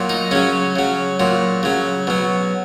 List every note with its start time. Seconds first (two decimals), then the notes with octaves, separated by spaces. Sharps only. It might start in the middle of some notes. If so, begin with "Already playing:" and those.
Already playing: A#2 F#3
0.09 D#4
0.31 C#3 F#3 C#4
0.76 C#3 F#3
1.20 A#2 F#3
1.63 C#3 F#3
2.07 B2 F#3